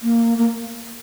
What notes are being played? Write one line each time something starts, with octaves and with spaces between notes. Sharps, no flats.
A#3
A#3